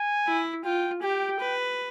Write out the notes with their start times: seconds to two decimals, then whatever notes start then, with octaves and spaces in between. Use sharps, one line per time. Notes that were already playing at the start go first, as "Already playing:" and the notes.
Already playing: G#5
0.27 E4
0.65 F4 G5
1.03 G4 G5
1.40 B4